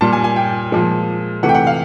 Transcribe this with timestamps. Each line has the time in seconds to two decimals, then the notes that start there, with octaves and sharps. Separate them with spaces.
0.01 A#2 G3 A5
0.13 G#5
0.24 G#5
0.36 G5
0.72 A#2 F3 G#3
1.43 C3 E3 A3 F#5
1.49 G5
1.54 F#5
1.67 F5